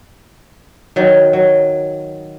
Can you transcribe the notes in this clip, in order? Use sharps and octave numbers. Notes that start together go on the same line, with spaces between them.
D#3 F#3
F#3